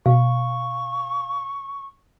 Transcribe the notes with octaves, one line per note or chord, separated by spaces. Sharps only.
B2 F5 C#6